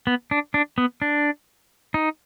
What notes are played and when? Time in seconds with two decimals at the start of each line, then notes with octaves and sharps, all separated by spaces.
0.07 B3
0.31 D4
0.54 D4
0.78 B3
1.02 D4
1.94 D#4